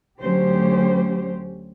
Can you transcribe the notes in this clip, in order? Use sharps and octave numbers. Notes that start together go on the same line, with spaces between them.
D2 F#3 C#4 G4 C5